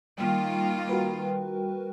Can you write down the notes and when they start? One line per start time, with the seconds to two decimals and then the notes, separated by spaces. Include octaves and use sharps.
0.18 D#3 G3 A#3 F4 G5
0.89 F#4 A#4 B4